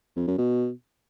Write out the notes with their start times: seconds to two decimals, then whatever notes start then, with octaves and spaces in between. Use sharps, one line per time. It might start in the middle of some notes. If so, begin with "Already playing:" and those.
0.16 F2
0.27 F#2
0.38 B2